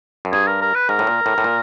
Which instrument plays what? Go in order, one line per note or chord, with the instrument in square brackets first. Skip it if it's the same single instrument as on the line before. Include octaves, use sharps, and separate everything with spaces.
[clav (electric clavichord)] F#2
[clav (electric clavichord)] G2 [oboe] G#4
[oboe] A#4
A#4
B4
[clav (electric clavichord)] G#2 [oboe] A#4
[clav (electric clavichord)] A2
A#2
A2
A2
A#2